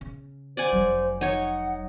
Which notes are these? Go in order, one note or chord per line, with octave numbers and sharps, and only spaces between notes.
C#3
C5 D5 F#5 G#5
F1 F#3
D#4 C#5 F#5